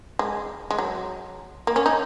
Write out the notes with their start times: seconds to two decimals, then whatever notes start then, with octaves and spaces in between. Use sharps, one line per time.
0.19 G#3
0.71 G#3
0.78 F#3
1.67 A#3
1.76 C#4
1.86 D#4